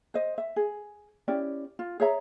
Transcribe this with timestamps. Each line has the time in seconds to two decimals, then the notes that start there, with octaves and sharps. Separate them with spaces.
0.14 C5 D#5
0.38 E5
0.56 G#4
1.28 C#4 E4 G4 D5
1.79 F4
2.00 G#4 C#5 E5 A#5